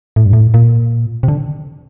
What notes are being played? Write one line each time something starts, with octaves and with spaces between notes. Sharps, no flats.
A2
G2
A2
A#2
C3
D3